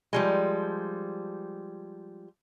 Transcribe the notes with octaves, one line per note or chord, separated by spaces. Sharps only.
F3 G3 G#3